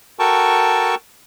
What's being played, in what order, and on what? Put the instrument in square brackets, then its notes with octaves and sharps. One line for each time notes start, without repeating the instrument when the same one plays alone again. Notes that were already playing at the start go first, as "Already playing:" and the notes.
[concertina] F#4 A4 A#4 G5 A5 C#6